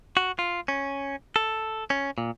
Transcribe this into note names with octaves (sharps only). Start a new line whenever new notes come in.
F#4
F4
C#4
A4
C#4
A#2